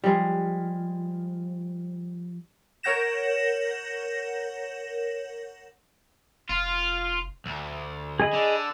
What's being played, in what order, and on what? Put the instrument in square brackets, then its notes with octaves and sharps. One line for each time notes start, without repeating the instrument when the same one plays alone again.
[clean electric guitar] F3 [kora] G3 G#3
[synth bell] A#4 C#5 F#5 G6 A#6 E7
[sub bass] F1 [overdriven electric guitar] F4
[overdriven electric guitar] D2 [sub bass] D3
[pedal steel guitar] G#4 D#5 B5
[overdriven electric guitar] D3